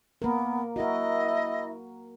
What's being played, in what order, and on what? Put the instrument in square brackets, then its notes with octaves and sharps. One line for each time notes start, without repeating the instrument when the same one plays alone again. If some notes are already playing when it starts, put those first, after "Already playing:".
[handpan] A#3 A#4 [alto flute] B3
[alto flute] E4 [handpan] F#4 A#4 [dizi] D#5